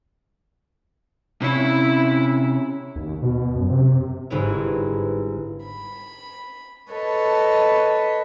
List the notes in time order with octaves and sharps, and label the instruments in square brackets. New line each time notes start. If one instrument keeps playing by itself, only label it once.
[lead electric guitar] C3 C#4 [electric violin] E4
[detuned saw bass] D#2
B2
F#2
C3
[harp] G1 G#2 C4 E4 B4 C#5
[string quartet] B5
A4 B4 C#5 D#5 A5